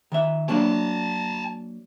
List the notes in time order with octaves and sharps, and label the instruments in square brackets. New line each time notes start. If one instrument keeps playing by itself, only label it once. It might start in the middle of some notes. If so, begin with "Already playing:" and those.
[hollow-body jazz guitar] D#3 E5
[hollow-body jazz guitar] F#3 A#3 D4 [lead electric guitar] G#5 A5